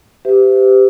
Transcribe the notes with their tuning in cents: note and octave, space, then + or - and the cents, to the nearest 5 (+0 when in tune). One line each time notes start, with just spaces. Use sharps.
G4 +0 C5 -45 E5 +0